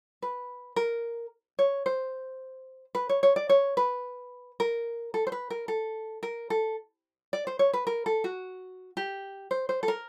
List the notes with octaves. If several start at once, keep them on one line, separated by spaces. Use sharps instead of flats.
B4
A#4
C#5
C5
B4
C#5
C#5
D5
C#5
B4
A#4
A4
C5
B4
A#4
A4
A#4
A4
D5
C5
C#5
B4
A#4
A4
F#4
G4
C5
C5
A4
A#4